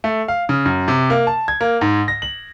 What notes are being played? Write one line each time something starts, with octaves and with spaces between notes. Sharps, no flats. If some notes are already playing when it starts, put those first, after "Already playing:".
A3
F5
C#3
F#2
C3
A#3
A5
G#6
A#3
G#2
A#6
F#7